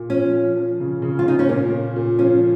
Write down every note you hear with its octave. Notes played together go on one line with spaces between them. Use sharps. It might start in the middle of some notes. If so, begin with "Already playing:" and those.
Already playing: A#2
F3 C#4
F3
F3
C#3
C#3
F4
C#3 D#4
C#4
A#2 A#3
A#2
A#2
F3 C#4